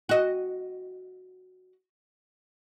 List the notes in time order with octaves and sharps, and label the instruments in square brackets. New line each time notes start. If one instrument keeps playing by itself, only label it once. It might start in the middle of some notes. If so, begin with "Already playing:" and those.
[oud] F#4 D#5